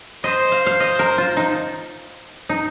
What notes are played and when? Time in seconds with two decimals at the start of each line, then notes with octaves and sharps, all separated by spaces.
0.23 C5 D#5
0.52 F5
0.67 F5
0.80 D#5
0.99 A#4
1.18 F4
1.37 D#4
2.49 D#4